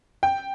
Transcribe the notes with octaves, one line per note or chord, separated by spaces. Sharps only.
G5